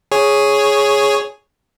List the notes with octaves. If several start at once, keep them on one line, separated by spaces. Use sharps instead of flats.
G#4 C#5